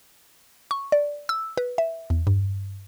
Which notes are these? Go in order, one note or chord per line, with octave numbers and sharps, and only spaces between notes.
C#6
D5
E6
B4
E5
E2
G2